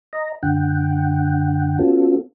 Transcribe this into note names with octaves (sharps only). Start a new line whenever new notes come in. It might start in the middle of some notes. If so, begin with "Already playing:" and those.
D#5 A#5
F#2 D3 F#5 G5
B3 C#4 F4 F#4 A4